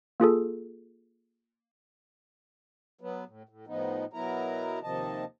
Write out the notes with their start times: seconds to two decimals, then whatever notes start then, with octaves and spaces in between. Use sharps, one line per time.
0.20 A#3 F4 G#4 A4
3.01 F#3 B3
3.27 A2
3.49 A2
3.67 A2 F3 B3 D#4
4.13 B2 F#3 B3 E4 A#4 A#5
4.83 D#2 C3 D#3 F3 D#5 A5